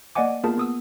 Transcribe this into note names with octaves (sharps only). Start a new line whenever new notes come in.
A#3 D5 D#5 F#5 G#5 D6
A#3 B3 F4 G#4 A#4 A5
B3 D#6 E6